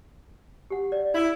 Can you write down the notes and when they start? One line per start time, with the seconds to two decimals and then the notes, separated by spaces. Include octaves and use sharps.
0.70 G4 F#5
0.92 D5
1.14 E4